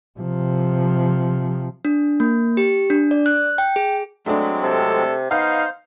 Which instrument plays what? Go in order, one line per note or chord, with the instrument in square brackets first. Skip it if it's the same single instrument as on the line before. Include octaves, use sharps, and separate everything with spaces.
[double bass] C3 F3
[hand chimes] D4
A#3
G4
D4
D5
F#6
G5
G#4
[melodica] F#3 G#3 C4 [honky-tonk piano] A3 D4
[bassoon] C3 [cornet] A4
[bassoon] B3 [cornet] D#4 [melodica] C5 [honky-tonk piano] F5